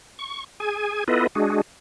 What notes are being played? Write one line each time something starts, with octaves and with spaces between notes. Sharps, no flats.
C#6
G#4 G#5
B3 E4 F4 A4 B4 D#5
G#3 D4 F#4 G#4